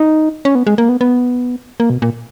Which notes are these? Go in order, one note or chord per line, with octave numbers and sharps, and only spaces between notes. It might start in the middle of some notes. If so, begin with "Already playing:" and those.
Already playing: D#4
C#4
B3
G#3
A#3
B3
B3
A#3
B2
A#2